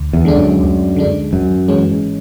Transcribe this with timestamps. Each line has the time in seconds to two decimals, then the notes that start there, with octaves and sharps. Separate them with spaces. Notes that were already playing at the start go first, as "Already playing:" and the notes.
Already playing: D2
0.13 E2
0.25 D3 G#3 D4
0.36 F#2
0.61 D2
0.96 D3 G#3 D4
1.32 G#1 F#2
1.68 G#2 E3 G#3 C#4